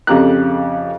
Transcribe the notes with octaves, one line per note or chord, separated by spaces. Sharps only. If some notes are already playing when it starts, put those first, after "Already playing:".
F2 C#3 G4 A4 A#5 F#6